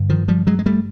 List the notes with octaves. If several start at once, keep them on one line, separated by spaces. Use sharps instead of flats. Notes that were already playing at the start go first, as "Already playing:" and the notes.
Already playing: G2 D3
D#3 F3
F3 G3
F#3 G#3
G#3
G3 A3